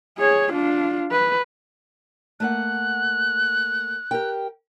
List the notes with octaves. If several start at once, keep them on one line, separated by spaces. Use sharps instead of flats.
G#4 C#5
D4 F4
B4
A3 A#3 F#5 F#6
G4 A#4 G5